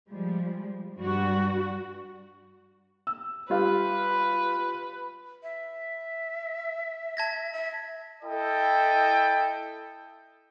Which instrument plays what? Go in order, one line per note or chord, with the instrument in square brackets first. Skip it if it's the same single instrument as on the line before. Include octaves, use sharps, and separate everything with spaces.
[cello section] F3 G3 G#3
G2 G3 F#4
[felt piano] E6
[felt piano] G3 F4 G4 [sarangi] B4
[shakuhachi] E5
[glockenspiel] A5 G#6 A#6
[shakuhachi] E5
[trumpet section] E4 A4 D#5 G5